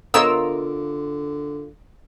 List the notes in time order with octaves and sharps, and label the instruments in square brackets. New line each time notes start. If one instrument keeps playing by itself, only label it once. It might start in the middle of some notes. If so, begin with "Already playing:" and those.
[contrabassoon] D3 [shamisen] B3 C#5 D#5 [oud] F4 A#4 [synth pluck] E6